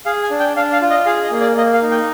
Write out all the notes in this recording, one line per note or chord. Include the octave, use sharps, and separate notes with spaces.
G#4 F5
G#5
D4
G5
D4 F5
F5
F4
D#5
G#4 F5
D#5
A#3
D5
A#3 D#5
F5
D#4
G5